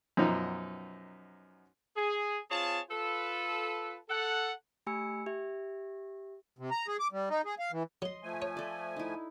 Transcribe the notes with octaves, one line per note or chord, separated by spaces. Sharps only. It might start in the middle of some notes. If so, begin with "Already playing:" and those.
F#2 B2 F3 D#4
G#4
C4 F4 G#4 C#5 A5
F4 A4 B4
A4 F#5
A3 G4 G#5 B5 E6 C#7
G4 E5
C3
A#5
G#4
D6
G3
D#4
G#4
F5
E3
F#3 D#5 C6
F3 A3 G#5
C#5
A4 D5
D#4 E4